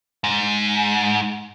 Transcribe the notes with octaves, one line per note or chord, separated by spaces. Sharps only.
G#2